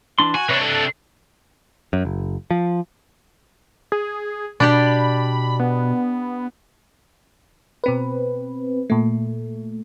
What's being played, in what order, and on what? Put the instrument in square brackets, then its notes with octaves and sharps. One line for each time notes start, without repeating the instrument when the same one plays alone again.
[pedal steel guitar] E3 D4 C6
[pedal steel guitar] F#4 [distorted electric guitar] G#5
[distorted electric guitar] C3 D4 [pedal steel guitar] B4 C#5
[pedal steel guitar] A4
[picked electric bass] F#2
F#1
F3
[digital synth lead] G#4
[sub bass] B2 [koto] D4 G4 D5 [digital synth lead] B5
[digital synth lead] B3
[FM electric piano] B2 C4 B4
A#2 A3